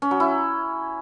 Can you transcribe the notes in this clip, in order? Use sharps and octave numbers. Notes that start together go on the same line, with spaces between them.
C#4
F#3
E4